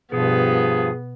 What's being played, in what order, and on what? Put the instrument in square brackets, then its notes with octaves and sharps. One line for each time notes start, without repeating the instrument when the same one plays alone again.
[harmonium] G2 F3 [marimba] B2 [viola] B3 [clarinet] G#4